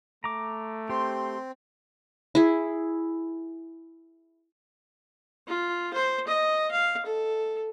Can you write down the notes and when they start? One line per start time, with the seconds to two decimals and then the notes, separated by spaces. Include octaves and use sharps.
0.24 A3 A#5 D6
0.90 C4 G4 C6
2.35 E4 G#4
5.47 F4
5.94 C5
6.28 D#5
6.71 F5
7.06 A4